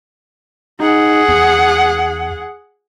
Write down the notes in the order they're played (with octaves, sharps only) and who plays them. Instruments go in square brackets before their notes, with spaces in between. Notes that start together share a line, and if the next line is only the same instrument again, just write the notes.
[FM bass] D#4 [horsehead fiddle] G#4 F#5
[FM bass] E2